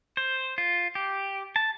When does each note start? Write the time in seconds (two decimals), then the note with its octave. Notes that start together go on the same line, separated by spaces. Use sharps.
0.17 C5
0.58 F4
0.95 G4
1.56 A5